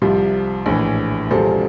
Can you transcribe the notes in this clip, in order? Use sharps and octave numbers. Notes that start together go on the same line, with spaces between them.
C2 C3 F3
A#1 A2 E3
E1 E2 C3 F3 A4 C5